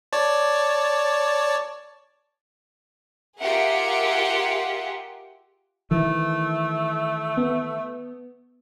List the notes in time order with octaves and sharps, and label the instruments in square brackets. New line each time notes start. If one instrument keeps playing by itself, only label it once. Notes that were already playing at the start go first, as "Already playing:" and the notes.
[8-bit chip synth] C#5 D5 A5
[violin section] F4 G4 G#4 A#4 E5 F#5
[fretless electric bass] D#3 E3 [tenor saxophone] A3
[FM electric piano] B3